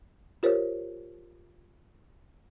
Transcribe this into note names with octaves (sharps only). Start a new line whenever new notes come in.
F4 G4 A#4 C5 C#5